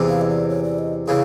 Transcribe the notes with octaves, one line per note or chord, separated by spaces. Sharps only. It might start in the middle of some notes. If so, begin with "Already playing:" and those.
Already playing: E2 C3 E3
F5
D#5
D5
C#5
D5
D#5
C#3 E3 F5